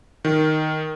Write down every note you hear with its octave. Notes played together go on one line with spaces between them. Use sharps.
D#3